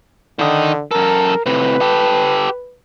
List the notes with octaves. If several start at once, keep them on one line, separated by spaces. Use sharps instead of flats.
D3 D#3 D#5
F#2 A4 A#4
A2 C3 B4
G4 A4